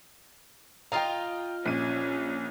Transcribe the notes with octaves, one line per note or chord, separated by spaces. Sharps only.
F4 D#5 F5 G5 A#5
A#1 C#4 D#7